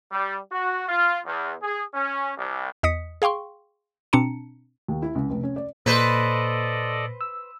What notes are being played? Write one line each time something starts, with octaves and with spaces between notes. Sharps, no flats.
G3
F#4
F4
E2
G#4
C#4
C2
E2 D#5 D#6 B6 C#7
G#4 F5 G5 C6 C#6
B2 C4 D4 A5 A#5 C#7
D#2
E4
C#2
F1
C#4
D5
A#2 A4 B4 C5 D5 D#5
E6